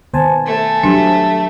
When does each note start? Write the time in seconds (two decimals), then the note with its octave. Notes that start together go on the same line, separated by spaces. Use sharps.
0.14 D#3 B3 C5 G#5 A5
0.46 A3
0.83 F#3 D4 G4